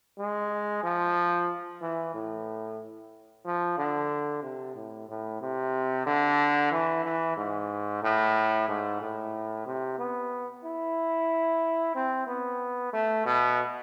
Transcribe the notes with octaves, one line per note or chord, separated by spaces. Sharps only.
G#3
F3
E3
A2
F3
D3
C3
A2
A2
C3
D3
E3
E3
G#2
A2
G#2
A2
C3
B3
E4
C4
B3
A3
B2